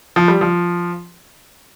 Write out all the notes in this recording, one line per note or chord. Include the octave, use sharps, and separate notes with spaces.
F3
G3
F3